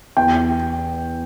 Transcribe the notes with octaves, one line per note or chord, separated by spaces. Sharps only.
E2 G5